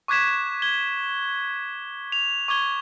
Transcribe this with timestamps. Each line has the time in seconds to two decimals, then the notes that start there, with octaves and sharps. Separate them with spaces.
0.08 C#6 D6 F#6 G#6 B6 E7
0.62 G#6 G7
2.12 F7
2.48 C#6 D6 G#6 G7